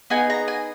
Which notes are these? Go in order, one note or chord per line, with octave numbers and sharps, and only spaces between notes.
B3 D#4 G#4 G#5
A#5
G#5